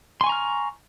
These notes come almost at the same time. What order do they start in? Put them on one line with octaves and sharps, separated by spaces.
C6 G#5 C#6 A#5 F6